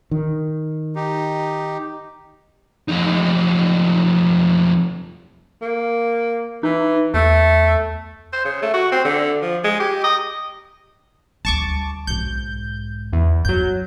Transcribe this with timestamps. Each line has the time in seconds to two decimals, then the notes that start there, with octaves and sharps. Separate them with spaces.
0.11 D#3
0.96 D#4 G4
2.89 F2 D#4
5.62 A#3
6.63 E3 D#4
7.14 E2 A3
8.33 C5
8.45 C#3
8.62 A3
8.74 F#4
8.92 C4
9.04 D3
9.42 F3
9.64 G#3
9.80 G4
10.04 D#5
11.45 D2 G3 A5 C#6 D6
12.07 B1 G#2 G6
13.13 E2
13.45 F#2 F#3 G6